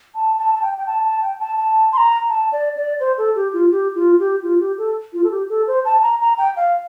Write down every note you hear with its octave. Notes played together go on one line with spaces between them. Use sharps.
A5
A5
A5
G5
G5
A5
A5
G5
A5
A5
C6
A#5
A5
D5
D5
C5
A4
G4
F4
G4
F4
G4
F4
G4
A4
F4
A4
G4
A4
C5
A5
A#5
A#5
G5
F5